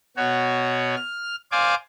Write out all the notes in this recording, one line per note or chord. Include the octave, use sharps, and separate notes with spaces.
B2 F#4 C#5
F6
C5 D5 F5 G#5 D6